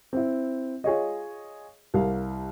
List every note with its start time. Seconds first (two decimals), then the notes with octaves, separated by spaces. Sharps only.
0.13 C4 E4
0.84 F4 G#4 C#5 D#5
1.94 C2 A#4 F5